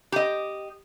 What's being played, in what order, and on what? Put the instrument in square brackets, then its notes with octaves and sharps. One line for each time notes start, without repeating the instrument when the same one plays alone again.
[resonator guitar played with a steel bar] G4 D#5